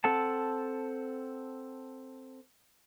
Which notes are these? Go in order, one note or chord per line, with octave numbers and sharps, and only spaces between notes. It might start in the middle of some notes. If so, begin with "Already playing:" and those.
C4 A4 F#5 A5